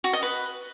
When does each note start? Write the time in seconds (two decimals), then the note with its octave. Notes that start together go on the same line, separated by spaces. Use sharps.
0.04 F#4
0.13 D#5
0.22 B4